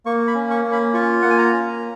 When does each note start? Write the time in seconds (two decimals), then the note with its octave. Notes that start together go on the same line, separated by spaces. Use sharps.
0.06 A#3 C#6
0.28 B5
0.35 C#4
0.50 C#6
0.65 A#3
0.72 B5
0.94 F4 C#6
1.22 A#3 F#5
1.30 G#5
1.38 A#5
1.52 C#4